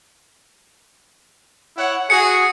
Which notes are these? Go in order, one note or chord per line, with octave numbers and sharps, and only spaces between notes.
E4 C#5 F#5
F#4 G#4 C#7